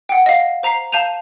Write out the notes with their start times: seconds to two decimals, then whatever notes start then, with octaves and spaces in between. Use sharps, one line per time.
0.09 F#5 G5
0.26 D#5 F5
0.63 C5 A#5 B6 C7
0.92 F5 A5 G6 D#7 F7